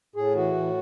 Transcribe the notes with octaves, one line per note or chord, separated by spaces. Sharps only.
A2 G#4
E3 F#4
A2